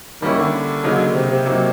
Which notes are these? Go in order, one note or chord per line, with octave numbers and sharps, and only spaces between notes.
D#3 G3 A#3 C#4 E4
D3
C#3 F#3 A#3 D#4
C3
C3
F#3 A#3 D#4